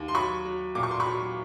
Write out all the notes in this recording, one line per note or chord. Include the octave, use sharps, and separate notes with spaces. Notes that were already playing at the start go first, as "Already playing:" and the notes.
Already playing: D#2
C6
F#3 B5 C#6
F#3
A#2 D6
C#6
C6
B5 C#6
F#3